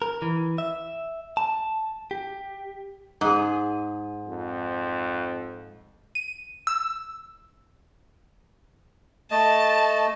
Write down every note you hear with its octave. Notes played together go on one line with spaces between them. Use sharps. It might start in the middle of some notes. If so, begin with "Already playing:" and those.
A#4
E3
E5
A5
G4
G#2 G#4
F2
D#7
E6
A3 D#5 A5